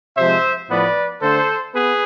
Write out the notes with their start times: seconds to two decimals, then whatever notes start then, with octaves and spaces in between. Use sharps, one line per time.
0.17 C3 F3 G#3 C5 E5
0.70 A2 F3 B3 B4 D5
1.22 D3 A3 A4 C5
1.75 B3 G#4 B4